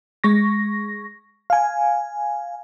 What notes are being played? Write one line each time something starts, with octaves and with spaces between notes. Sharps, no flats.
G#3 C#6 A#6
F5 G#5